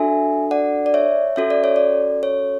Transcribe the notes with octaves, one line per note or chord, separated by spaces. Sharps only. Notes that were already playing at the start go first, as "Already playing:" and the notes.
Already playing: D4 F#4 A4 E5 G#5
D5 F#5
D5
C#5 E5
C#4 F#4 A4 E5
D5
C#5
D5
C#5